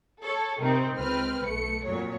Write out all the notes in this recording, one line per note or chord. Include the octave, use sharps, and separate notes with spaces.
A4 C#5
C3 D#3 C4
C#2 C4 B4 F6
B1 A3 C#7
F2 A#2 F#3 C#5